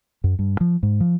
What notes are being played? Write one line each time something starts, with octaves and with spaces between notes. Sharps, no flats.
F#2
G2
F3
G#2
F3